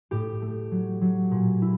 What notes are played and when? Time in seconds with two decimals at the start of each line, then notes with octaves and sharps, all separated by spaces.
0.11 A2 G4
0.42 A3
0.71 F#3
1.01 F#3
1.31 A#2
1.62 E4